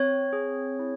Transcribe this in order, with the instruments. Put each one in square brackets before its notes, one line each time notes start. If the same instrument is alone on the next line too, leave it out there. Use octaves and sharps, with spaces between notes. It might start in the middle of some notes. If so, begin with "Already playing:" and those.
Already playing: [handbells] C4 C#5
G#4
E4